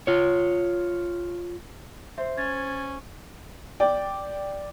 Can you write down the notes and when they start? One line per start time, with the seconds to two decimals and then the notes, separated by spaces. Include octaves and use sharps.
0.07 F4 C#5
2.18 C5 E5
2.38 C#4 G#6 A6
3.80 D5 G5